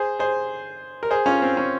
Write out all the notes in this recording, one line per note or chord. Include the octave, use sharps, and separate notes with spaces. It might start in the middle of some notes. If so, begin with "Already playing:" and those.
Already playing: G#4 C5
G#4 C5
A#4
G#4 C5
C#4 F4
C4
C#4